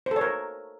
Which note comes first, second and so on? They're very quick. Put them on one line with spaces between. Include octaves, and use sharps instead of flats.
C5 A4 C#5 A#4